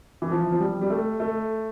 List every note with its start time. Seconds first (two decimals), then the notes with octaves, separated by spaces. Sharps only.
0.22 E3
0.31 F3
0.52 F3
0.60 G3
0.81 G3
0.90 A3
1.20 A3